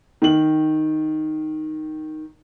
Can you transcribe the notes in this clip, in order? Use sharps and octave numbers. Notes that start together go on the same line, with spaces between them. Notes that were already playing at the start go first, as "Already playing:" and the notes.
D#3 F#7